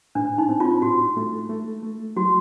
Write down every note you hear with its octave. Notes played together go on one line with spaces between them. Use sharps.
A2 D4
D#4
C4
F4
A2 F#4
A3
A3
A3
F#3 F#4